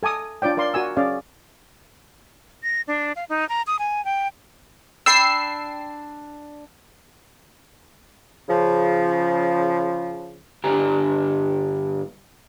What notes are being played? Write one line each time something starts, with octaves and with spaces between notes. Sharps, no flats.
A4 G#5 D6 D#6
D4 F4 C#5 D5 G5
A#4 D5 F5 C6
F#4 A#4 G#5 E6
C#4 G#4 D5 F5
A#6
D4
F5
D#4
A#5
D#6
G#5
G5
D4 G5 B5 E6 C7
C#3 F3
G2 D3 G4 G#5 A#5